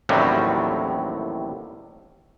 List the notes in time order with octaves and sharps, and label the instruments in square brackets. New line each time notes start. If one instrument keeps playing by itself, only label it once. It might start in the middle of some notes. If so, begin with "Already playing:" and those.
[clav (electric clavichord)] A1 D#2 A2 C3 F#3 G3